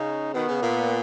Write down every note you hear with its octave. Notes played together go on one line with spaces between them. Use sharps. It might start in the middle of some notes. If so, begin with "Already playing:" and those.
Already playing: C#3 D#4
B2 D#3 B3
C#3
A#2